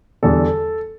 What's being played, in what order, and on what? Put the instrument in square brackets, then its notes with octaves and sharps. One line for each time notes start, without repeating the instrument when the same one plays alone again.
[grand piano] E2 D3 G3 A4